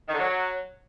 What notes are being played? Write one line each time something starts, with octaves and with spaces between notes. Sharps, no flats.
D#3
D3
F#3